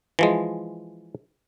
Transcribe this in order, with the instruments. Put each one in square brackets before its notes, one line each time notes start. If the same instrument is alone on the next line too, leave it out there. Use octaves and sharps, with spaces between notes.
[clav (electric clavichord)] E3 F3 G#3